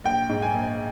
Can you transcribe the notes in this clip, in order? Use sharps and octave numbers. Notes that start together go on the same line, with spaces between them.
A#1 G5
G#2
G#5
A#1